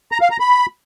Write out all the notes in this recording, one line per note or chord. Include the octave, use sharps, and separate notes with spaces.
A#5
F5
A#5
B5